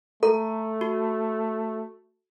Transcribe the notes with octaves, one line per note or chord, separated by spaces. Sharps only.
A3 A4 A#5
F#4